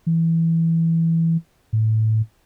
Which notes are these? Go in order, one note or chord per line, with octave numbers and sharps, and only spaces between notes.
E3
A2